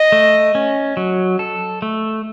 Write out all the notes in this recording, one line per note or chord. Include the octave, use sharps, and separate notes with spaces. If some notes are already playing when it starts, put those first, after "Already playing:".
Already playing: D#5
A3
C#4
F#3
A4
A3